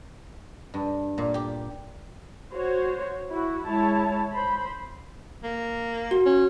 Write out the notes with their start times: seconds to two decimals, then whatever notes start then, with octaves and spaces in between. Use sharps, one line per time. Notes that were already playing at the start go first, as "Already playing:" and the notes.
0.74 G2
1.18 A#2
1.34 G4
2.52 F#4 C5 C#5
3.31 E4 F#4
3.66 G#3 E4 C#5 A5
4.34 C5 B5
5.44 A#3
6.11 F#4
6.26 C#4